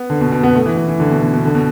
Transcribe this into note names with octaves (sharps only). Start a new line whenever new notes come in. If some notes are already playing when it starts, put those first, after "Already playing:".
Already playing: B3
D3
B2
B2
B3
A3
E3
E3
E3
D3
B2
D3
B2
D3
B2